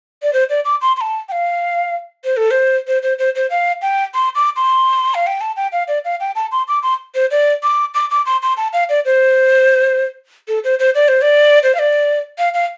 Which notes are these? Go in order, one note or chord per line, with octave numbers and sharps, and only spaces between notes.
D5
C5
D5
D6
C6
C6
A5
G5
F5
C5
A4
C5
C5
C5
C5
C5
F5
G5
C6
D6
C6
F5
G5
A5
G5
F5
D5
F5
G5
A5
C6
D6
C6
C5
D5
D6
D6
D6
C6
C6
A5
F5
D5
C5
A4
C5
C5
D5
C5
D5
C5
F5
D5
F5
F5